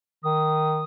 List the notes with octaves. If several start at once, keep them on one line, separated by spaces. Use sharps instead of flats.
D#3 D#6